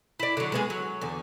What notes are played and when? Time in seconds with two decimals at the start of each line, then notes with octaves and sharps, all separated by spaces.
0.20 E4 D5
0.37 D3 F#3
0.52 G#3 B3 G#4
0.70 F#3
1.01 E2 D3